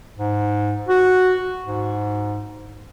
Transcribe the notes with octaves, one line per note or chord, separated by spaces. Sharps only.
G#2
F#4
G#2